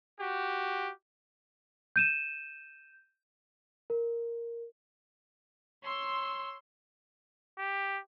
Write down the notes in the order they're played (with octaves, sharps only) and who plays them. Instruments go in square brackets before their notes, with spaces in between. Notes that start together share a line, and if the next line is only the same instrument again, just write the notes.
[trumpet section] F#4 G4
[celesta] G6 D#7 E7
A#4
[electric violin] C#5 E6 [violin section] C6
[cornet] G4